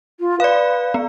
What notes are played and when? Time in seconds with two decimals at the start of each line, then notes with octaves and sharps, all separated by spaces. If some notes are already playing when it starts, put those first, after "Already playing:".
0.20 F4
0.40 B4 D5 F5
0.94 B3